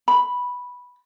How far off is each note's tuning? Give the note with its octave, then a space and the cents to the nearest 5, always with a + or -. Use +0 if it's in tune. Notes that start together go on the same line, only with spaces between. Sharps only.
B5 -5